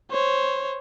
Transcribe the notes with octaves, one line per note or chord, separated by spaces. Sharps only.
C5 C#5